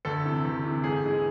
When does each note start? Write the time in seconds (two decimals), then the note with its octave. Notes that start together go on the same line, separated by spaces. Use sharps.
0.05 D2 A4
0.25 C3 E3
0.45 D2
0.64 C3 E3
0.84 G#2 G#4
1.04 E3 G#3